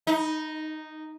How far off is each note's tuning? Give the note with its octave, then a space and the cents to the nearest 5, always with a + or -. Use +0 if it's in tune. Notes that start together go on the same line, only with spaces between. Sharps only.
D#4 -5